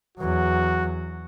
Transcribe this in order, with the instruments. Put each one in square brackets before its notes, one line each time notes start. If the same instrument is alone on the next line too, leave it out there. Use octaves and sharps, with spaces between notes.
[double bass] E2 F#3 [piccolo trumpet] F#4